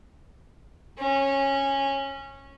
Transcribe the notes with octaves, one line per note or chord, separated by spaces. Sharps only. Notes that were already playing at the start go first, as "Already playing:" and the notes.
C#4